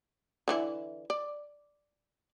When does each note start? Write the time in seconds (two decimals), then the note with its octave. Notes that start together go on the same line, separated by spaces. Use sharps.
0.48 D3 E3 E4
1.10 D5